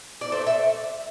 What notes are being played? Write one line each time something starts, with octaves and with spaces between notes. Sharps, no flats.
D5
A3 C5
E5